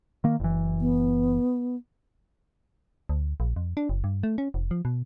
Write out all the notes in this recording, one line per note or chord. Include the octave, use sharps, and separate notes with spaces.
D#3 A#3
F#1 E3
B3
D2
A#1
F2
D4
F#1
G2
A3
C#4
F1
F3
B2